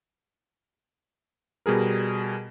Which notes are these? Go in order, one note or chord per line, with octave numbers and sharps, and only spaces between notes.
B2 G3 G#4 A#4